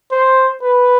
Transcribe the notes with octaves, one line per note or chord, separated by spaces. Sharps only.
C5
B4